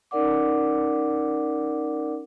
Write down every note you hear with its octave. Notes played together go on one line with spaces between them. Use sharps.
C#4 D#4 A#4 D5 F#5 D6